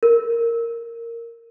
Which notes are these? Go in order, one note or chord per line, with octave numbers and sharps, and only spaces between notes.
A#4